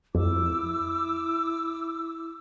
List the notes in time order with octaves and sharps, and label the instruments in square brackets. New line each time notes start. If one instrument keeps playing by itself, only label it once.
[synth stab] F2 [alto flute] E4 [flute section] D6 E6